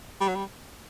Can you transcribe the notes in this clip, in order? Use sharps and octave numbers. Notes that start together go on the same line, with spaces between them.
G3
F#3
G3